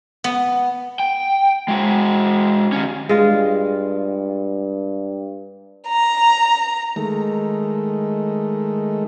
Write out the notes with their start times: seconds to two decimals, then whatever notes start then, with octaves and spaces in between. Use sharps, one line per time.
0.24 B3
0.99 G5
1.68 G#3 F#4
2.72 D#3 C#4
3.09 G2 G#3 F4
5.88 A#5
6.96 D#3 G#3 A3